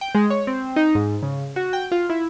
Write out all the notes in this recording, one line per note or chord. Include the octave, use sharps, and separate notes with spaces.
G5
G#3
C#5
C4
D#4
G#2
C#3
F#4
G5
F4
E4